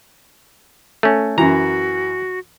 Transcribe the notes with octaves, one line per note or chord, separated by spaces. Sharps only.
A3 C#4
F#2 E3 F#4 A#5